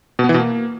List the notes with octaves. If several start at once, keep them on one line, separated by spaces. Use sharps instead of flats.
B2
B3
E3
B2
A#3